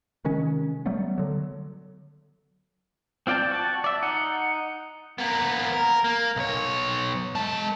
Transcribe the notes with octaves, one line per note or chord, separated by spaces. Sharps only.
C3 D#3 G#3 C#4
F#3 G3 A3 B3
D3 F#3
C4 F4 D5 G5 A5
F#4 A5
D5 E5
D#4 F#5
A#3 B3
A#4
A#3
B1 C#5
G#3 A5